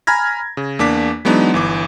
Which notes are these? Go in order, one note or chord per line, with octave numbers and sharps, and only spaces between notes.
G#5 A#5 B5 F6 G#6 A#6
C#3
E2 A#3 D4 D6 B6
E3 F#3 G#3 B3 D4 D#4
G1 E3 D6